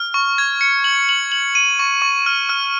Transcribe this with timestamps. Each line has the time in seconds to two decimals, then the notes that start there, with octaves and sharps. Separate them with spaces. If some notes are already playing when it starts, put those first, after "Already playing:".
Already playing: F6
0.14 C#6
0.38 G#6
0.61 C#7
0.84 F#7
1.09 F#7
1.32 F#7
1.55 D#7
1.79 C#6
2.02 C#6
2.26 F6
2.49 F6